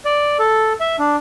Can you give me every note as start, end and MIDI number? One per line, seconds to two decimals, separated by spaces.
0.05 0.37 74
0.39 0.73 69
0.80 0.96 76
0.99 1.16 62